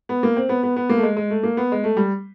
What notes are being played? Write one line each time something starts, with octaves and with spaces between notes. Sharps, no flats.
B3
A#3
C4
B3
B3
B3
A#3
A3
G#3
G#3
A3
A#3
B3
G#3
A3
G3